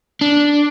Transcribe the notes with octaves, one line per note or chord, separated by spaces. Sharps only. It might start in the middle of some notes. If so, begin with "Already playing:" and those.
D4